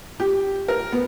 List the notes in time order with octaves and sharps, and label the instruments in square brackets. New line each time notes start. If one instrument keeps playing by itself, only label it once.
[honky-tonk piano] G4
A#4
B3